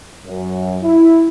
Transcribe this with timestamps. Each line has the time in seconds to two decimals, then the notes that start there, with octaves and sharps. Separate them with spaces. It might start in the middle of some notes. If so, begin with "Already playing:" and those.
0.25 F#2
0.83 E4